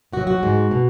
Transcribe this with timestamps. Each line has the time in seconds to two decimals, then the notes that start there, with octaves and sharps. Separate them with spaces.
0.13 F#2 F#3 F#4
0.27 F#4
0.43 G#2 G#3
0.71 B2